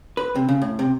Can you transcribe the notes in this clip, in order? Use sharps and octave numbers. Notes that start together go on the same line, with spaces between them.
B4
C3
C#3
A2
C3